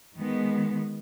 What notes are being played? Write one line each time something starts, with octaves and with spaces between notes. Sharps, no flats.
D#3 G#3 B3